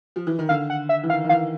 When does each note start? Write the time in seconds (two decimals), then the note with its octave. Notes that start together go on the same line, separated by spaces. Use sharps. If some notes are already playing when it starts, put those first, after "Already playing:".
0.16 F3
0.27 E3
0.39 D#3
0.49 D3 F5
0.70 F#5
0.89 E5
1.03 E3
1.10 D#3 F5
1.25 D#3
1.29 E3 F5